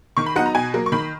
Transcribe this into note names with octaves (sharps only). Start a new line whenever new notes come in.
D#3 C#6
B5
F#3 B3 D#4 F#5
A#5
B2 G#5
F#3 A#3
C#6
D#3 B5